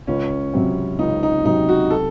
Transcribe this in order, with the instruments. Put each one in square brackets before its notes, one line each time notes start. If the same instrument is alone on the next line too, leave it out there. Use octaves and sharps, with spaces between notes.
[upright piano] C#2 [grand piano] C#4
[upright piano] C3 F#3 C4
[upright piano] C#2 [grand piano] D#4
[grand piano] D#4
[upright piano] C3 F#3 C4 [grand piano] D#4
[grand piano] F#4
A4